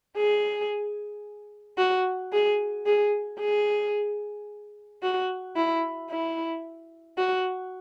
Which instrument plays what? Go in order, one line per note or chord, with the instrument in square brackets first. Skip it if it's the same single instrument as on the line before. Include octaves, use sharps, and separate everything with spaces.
[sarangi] G#4
F#4
G#4
G#4
G#4
F#4
E4
E4
F#4